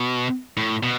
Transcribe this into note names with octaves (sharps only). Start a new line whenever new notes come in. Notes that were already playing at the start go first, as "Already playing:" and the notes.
Already playing: B2
A2
B2